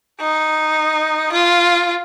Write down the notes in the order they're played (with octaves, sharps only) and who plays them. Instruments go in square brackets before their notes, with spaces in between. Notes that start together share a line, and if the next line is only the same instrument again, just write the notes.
[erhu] D#4
F4